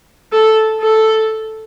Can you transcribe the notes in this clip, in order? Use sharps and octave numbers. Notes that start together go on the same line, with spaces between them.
A4
A4